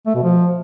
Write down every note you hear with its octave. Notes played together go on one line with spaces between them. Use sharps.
A3
B2
F3